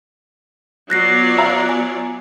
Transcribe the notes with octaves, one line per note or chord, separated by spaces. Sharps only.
F#3 B3 F4 C#5 D5 F#6 A#6 C7
E5 F5 A#5
G#5